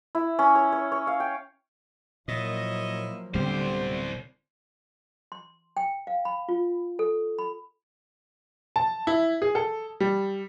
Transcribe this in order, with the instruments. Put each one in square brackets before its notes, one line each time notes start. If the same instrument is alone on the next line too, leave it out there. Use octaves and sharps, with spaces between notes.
[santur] E4
C#4
C#5
C#5
C#5
F5
G5
[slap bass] A#2 [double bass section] F3 F#3 A#3 [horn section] E4 C#5 D#5
[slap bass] D1 G3 B3 [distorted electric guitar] C2 C5 [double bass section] D3 C4 [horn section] G4
[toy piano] C6
G5
F5
B5
F4
A4
B5
[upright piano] A5
E4
G#4
A4
G3